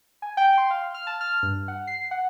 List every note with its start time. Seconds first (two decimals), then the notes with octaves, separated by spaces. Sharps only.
0.22 G#5
0.37 G5
0.58 C6
0.70 F5
0.94 F6
1.07 A5
1.21 F6
1.43 G2
1.68 F#5
1.87 C7
2.11 F#5